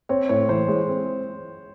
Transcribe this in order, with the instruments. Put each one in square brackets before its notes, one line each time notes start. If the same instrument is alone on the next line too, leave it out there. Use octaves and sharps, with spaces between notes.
[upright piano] C4 [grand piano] C#5
[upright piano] A2 [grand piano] C#5
[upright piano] E3 [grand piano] C5
[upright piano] G#3 [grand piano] C#5
[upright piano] C4